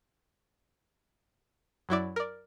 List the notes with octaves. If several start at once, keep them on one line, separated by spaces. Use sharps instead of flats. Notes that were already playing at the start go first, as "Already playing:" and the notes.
F#2 F#3 E4 D5
A#4 D5